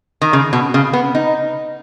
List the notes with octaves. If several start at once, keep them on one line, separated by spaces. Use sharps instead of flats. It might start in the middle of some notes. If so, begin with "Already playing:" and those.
D#3
C#3
B2
C#3
B3
D#4